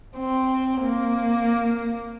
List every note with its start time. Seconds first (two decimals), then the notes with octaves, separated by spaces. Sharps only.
0.17 C4
0.81 A#3